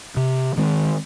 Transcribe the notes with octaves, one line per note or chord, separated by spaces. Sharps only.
C3
D#3 G#3 C4